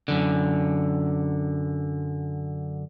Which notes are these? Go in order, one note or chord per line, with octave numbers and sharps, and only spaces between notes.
F#2 D3